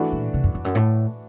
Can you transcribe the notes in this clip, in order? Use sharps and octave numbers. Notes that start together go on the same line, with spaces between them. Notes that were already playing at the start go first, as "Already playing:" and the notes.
Already playing: E3 A3 D4 F#4
A#2
C3
F#2
F2
F#2
A2